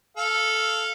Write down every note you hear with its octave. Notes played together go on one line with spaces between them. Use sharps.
A4 F5